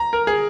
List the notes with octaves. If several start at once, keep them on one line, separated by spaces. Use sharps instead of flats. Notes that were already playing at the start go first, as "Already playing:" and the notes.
Already playing: A#5
A#4
G#4